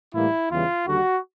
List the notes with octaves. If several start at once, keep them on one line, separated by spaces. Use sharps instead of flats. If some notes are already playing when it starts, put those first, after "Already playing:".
A2 E3 G3 A#3 E4
E2 C#3 E3 G3 F4
D#2 D3 G3 F#4